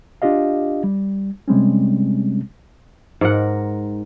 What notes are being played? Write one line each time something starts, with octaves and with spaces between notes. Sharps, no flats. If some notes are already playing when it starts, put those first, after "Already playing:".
D4 F4 G4 D#5 F5
G3
C3 G3 G#3 C4 C#4
G#2 A#4 F#5